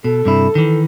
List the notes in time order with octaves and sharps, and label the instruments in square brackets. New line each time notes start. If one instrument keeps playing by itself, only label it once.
[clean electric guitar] B2 [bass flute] A4
[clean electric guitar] G2 C3 E4
D#3 E3